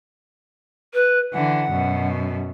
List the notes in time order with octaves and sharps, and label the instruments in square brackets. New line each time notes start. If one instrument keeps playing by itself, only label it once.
[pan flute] B4
[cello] D3 E3 [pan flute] F#5
[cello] F#2 B2